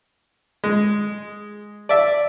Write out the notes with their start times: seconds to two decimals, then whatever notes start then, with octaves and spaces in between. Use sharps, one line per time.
0.64 G#3
1.89 D5 E5